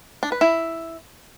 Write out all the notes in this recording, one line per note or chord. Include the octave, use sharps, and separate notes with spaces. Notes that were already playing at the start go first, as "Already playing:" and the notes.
D4
B4
E4